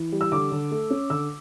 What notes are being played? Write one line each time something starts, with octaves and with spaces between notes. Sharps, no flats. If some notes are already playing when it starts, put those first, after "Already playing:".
Already playing: E3
G3
E6
D3 D6
D3
A3
C#4
D3 E6